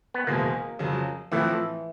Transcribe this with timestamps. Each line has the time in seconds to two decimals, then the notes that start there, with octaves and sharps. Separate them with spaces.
0.14 B3
0.27 F#1 E2 B2 G#3 A#3
0.79 F2 C#3 F#3
1.32 A2 E3 F3 A3 C4 F4